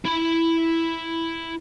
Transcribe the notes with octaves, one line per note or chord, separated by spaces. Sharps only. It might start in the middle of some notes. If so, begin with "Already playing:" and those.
E4 B5